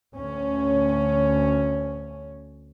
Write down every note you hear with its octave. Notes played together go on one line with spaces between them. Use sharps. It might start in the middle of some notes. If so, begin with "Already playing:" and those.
D2 C#4